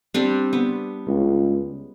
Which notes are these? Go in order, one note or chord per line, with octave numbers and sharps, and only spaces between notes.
G3 C4 D4
B3
C#2